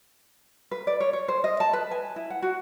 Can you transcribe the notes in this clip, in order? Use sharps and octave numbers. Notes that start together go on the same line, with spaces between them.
B4
D5
C#5
C#5
C5
D#5
A5
B4
G#5
E4
F#5
F#4